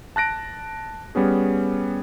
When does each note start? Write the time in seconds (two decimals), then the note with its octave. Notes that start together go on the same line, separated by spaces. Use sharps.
0.16 A5 F#6 A#6 D7
1.15 G3 B3 C#4 G#4